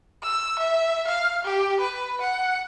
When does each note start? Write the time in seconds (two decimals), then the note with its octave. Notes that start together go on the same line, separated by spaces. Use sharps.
0.23 E6
0.59 E5
1.07 F5
1.44 G4
1.80 B4
2.21 F#5